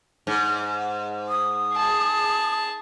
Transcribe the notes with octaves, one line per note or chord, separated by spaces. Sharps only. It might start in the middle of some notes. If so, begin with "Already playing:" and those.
G#2
D#6
G#4 A5